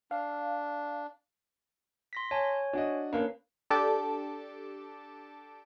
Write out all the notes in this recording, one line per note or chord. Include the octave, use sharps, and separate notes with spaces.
D4 F5
C6 A#6 B6
C#5 G#5 A5
D4 F#4 D#5
A#3 C#4 D4 B4 F5
D4 G4 A4 A5 D6